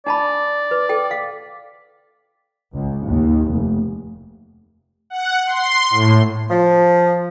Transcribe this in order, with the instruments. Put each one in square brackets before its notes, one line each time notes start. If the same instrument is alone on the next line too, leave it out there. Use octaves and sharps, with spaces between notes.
[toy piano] D4 A5 B5 [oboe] D5
[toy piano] B4
A4 G5
F5
[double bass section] C#2
D#2
F1
[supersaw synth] F#5
C6
A2
[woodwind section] F3